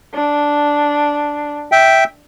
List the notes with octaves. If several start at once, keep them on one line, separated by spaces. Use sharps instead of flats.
D4
E5 G5